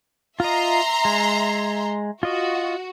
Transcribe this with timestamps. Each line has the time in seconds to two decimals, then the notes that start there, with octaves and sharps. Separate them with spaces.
0.40 F4 D#5 E5 A#5 C6
1.05 G#3
2.23 F4 F#4 D#5